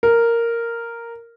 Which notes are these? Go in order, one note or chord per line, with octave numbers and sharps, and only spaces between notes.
A#4